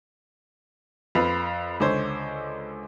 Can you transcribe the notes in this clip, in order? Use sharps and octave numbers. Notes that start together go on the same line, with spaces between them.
F2 B4 F5
C#2 D3 C5 C#5